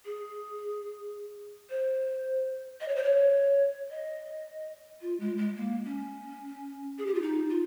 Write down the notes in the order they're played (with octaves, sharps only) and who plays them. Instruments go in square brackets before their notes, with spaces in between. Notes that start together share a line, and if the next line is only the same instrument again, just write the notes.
[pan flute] G#4
C5
D#5
C#5
C5
C#5
D#5
F4
G#3
G#3
A#3
C#4
G#4
G4
F4
D#4
F4